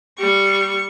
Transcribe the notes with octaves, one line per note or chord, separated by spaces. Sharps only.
G3 C#6